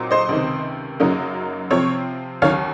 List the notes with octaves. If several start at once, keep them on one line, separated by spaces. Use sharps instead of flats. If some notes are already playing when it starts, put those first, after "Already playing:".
Already playing: A#2 F#3 C4 D#4
C5 D#5
C#2 C3 D#3
F#2 C#3 F#3 A#3 D#4
C3 F3 C4 C#5
D#2 D#3 F#3 C#4 C#5 F5